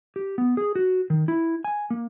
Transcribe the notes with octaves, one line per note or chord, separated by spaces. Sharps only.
G4
B3
G#4
F#4
D#3
E4
G#5
A#3